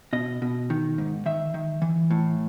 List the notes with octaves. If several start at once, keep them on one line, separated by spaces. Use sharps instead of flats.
B2 D#5
B2
D#3
G#2
D#3 E5
D#3
E3
A2